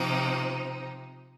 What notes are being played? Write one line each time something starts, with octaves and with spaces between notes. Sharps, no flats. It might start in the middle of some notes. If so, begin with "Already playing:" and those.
Already playing: C3 F3 C4 D#4 D6